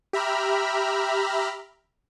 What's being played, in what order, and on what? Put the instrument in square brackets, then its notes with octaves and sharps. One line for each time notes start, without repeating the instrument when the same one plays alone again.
[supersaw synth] G4 E5 A#5 B5 F6